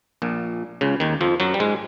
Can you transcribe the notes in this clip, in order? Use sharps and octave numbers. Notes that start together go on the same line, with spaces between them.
A#1 A#2
C#2 C#3
D#2 D#3
F2 F3
F#2 F#3
G3
G#2 G#3